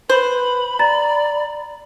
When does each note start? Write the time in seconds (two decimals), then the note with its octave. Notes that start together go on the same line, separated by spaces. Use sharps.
0.09 B4 C5 B5
0.79 D5 A#5 A6